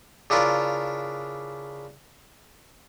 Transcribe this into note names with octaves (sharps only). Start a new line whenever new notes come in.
C#3 D4 E4 F4 A#4